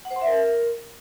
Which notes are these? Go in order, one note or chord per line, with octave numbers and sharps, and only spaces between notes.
F#5
C5
C6
E5
A#4